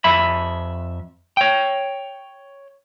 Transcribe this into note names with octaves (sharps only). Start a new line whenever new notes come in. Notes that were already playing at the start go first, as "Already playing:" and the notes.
F2 E5 B5
C#5 G5